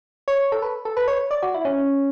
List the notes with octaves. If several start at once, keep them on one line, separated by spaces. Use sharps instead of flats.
C#5
A4
B4
A4
B4
C#5
D5
F#4
E4
C#4